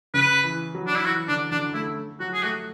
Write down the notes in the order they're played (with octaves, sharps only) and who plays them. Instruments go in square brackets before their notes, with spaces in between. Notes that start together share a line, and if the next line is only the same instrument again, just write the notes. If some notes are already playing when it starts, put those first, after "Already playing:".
[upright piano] C#3 [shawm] B4
[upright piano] E3
F#3
[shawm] D4
E4
[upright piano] E3 [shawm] F#4
[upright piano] D3 [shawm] D4
[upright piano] D3 [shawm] D4
[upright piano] A3 [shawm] E4
[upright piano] F#3 [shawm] F#4
[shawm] G#4
[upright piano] A3 [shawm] F#4